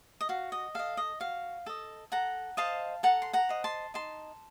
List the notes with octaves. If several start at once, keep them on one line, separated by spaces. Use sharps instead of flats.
D#5
F#4 F5
D#5
A4 D#5 F5
D#5
F#4 F5
A4 D#5
A4 F#5 A#5
C5 D#5 F5 A5
A4 F#5 A#5
C6
F#5 A#5
C5 D#5
A5 C6
D#4 A5 C6